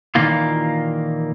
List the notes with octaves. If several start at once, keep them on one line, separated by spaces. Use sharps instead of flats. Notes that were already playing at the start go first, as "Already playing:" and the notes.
A#2 D#3 E3 A#3 F4